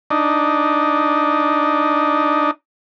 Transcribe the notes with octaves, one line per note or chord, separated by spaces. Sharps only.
D4 D#4